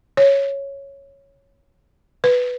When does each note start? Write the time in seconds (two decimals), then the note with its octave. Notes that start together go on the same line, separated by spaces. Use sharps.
0.17 C#5
2.24 B4